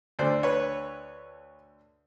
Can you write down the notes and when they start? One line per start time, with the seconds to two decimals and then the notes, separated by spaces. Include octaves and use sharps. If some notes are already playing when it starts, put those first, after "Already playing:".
0.19 D2 D3 C5 D5
0.43 B4 C#5